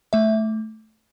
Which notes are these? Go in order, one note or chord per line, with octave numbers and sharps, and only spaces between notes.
A3 E5